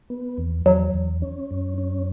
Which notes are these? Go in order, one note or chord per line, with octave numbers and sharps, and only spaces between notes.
B3
E2
E2 F#3
E2
C#4
F#2
C#4